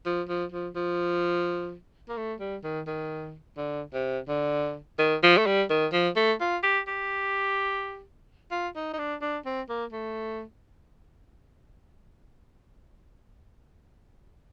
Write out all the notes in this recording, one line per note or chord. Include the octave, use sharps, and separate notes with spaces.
F3
F3
F3
F3
A#3
A3
G3
D#3
D#3
D3
C3
D3
D#3
F3
A3
G3
D#3
F3
A3
F4
G4
G4
F4
D#4
D#4
D4
D4
C4
A#3
A3